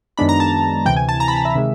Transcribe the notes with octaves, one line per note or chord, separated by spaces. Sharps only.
F#2 D#3 G#3 B3 D4 B5
A#5
A5
D2 C3 E3 G5
G#5
A5
A#5
B5
A5
E5
C3 D#3 G#3